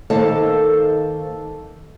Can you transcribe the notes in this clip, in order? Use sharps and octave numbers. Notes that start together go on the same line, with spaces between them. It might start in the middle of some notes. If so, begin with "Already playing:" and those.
D#3 A#3 A4 C5 F5 A5